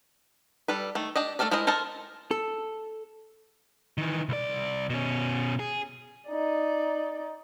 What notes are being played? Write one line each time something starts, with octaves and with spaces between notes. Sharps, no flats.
G3 A4 B4
D#3 A3
D4 G4 D#5
A3 C#4 A4 A#4 D5
G#3 E4 A#4 C5 D#5
A4 A#4 C5 D#5 A5
A4
D#3 E3
C2 D5
B2 C#4
G#4
D#4 D5